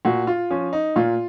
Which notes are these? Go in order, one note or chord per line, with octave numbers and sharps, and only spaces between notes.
A#2 F#4
F4
F3 C#4
D#4
A#2 F4